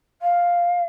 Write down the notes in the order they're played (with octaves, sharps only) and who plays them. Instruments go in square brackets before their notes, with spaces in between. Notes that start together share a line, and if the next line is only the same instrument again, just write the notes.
[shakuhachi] F5